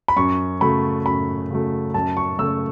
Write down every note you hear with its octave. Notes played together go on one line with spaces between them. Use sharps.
B5
F#2 C#6
C#3 F#3 A3 B5
F#2 B5
C#3 F#3 A3
F#2 A5
C#6
C#3 A3 E6